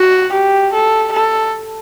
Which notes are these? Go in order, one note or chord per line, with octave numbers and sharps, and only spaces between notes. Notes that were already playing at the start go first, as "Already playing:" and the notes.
Already playing: F#4
G4
A4
A4